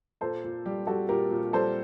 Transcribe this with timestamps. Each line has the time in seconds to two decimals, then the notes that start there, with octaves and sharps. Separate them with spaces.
0.21 A#2 A4 C5
0.44 A#2
0.66 G3 G4
0.87 G3 F#4 A4
1.09 A#2 G4 A#4
1.31 A#2
1.53 G3 A4 C5